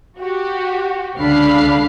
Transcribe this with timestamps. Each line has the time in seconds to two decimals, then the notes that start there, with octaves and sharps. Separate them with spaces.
0.18 F#4 G4
1.17 C#2 D3 D4 F5 B5 C7